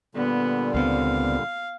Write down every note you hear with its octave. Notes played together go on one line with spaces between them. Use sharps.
A#2 D3 G3 B3
C#2 B3 C4 F5